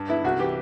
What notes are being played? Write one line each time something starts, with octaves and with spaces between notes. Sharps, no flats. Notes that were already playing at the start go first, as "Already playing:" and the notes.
Already playing: G2
B3 E4
C2 F#4
E3 G4